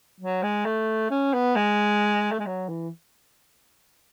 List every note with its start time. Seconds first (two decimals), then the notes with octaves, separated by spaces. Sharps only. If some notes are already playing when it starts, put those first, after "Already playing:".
0.20 F#3
0.42 G#3
0.65 A3
1.10 C#4
1.33 B3
1.56 G#3
2.32 A3
2.39 G#3
2.46 F#3
2.69 E3